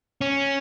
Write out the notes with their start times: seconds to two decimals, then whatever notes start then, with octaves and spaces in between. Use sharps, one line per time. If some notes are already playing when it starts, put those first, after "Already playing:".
0.21 C#4